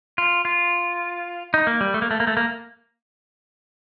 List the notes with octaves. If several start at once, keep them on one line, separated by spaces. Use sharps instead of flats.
F4
F4
D#4
A#3
G3
A3
A#3
A3
A#3
A3
A#3